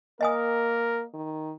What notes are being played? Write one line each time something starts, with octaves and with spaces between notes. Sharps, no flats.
A#3 A#4 D#5 G#5 D#6
D#3